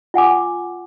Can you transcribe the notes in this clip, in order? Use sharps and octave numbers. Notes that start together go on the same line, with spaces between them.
F4 F#5 G#5 D6